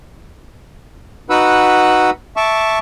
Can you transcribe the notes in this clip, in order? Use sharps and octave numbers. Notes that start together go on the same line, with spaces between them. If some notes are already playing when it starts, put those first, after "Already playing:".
D#4 F#4 B4 F#5 B5 E6
E5 A5 C#6 D6